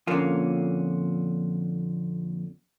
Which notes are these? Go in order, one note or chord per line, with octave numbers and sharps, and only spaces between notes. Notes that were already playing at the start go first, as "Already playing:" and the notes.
F2 A#2 D3 A#3 C#4 F4